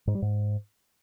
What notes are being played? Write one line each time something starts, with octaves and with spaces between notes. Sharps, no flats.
G#2
G3
G#2